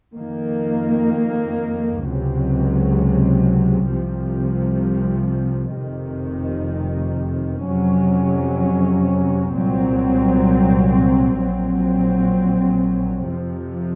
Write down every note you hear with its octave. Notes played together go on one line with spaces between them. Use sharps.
F2 D#3 A#3
C#2 C3 F#3
C2 C3 F3
F1 F2 C3 D#3
F2 C3 F#3 C#4
C2 A#2 F#3 C4
A#1 A#2 F#3 C4
F2 C3 F3